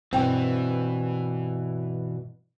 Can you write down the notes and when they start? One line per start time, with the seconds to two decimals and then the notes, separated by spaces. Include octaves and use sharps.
0.13 G2 B2 E3 C4 G5